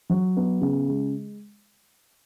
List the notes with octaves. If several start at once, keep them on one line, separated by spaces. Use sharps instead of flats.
F#3
B3
C#3
G#3